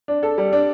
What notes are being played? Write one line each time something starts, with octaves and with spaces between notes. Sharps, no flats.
D4
A4
G3
D4